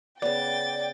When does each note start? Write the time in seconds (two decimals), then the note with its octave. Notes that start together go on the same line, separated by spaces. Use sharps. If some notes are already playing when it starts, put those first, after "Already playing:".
0.22 C#3 B3 D5 G5 A6